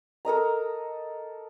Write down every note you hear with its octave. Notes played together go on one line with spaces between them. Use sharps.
A4 A#4 D#5 A#5